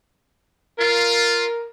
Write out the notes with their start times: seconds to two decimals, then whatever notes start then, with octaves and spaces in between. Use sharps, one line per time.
0.78 F4 A#4